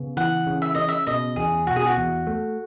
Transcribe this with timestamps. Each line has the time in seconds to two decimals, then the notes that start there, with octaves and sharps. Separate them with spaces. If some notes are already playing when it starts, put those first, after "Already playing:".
Already playing: C#3 B3
0.17 E3 F#5
0.47 C#3
0.62 E5
0.75 C#3 D#5
0.88 E5
1.07 B2 D#5
1.36 E2 G#4
1.67 B2 F#4
1.76 G#4
1.86 F#4
1.97 E2
2.27 A3